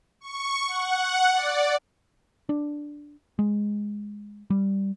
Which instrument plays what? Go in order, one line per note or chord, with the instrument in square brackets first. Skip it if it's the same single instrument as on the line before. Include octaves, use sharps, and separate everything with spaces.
[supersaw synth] C#6
F#5
D5
[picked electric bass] D4
G#3
G3